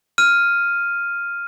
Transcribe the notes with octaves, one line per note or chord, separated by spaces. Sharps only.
F6 D#7